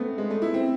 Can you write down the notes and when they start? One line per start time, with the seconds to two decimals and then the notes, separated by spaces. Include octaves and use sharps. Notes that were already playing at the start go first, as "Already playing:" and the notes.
Already playing: A3 B3 C4
0.18 G#3
0.30 A3
0.42 E4
0.54 C4